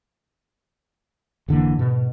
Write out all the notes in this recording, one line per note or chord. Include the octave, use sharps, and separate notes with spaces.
F1 D3 E3 A#3
G#2 B2